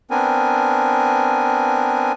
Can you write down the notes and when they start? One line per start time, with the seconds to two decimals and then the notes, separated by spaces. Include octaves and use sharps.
0.11 B3 C4 D4 A#4 G#5